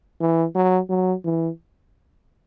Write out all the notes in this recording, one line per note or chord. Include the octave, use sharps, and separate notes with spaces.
E3
F#3
F#3
E3